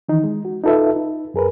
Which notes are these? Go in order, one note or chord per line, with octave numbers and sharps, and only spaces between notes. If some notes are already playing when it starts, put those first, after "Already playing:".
D#3 E3 D#4
G#3
F#4
D#4 F4 A4 B4 E5
D#4
F#2 G#4 A#4 B4